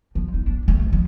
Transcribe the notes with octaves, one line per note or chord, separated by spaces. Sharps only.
F3
D#4
D4
A3
F2
F3